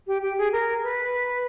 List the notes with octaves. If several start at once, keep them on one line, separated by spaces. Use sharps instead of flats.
G4
G4
G#4
A#4
B4